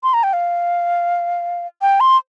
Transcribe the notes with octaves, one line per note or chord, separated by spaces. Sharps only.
C6
A#5
G5
F5
G5
C6